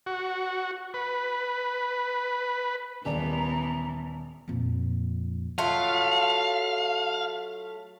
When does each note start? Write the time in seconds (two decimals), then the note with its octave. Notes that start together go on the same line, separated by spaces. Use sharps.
0.06 F#4
0.94 B4
3.05 D#1 E3 B3 D5 A#5
4.48 F2 A#2
5.58 F#3 A3 F4 F5